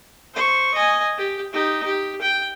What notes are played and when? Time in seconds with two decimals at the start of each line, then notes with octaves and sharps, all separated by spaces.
0.34 C5 C#6
0.74 D#5 G#5
1.18 G4
1.53 D#4 G4
1.85 G4
2.22 G5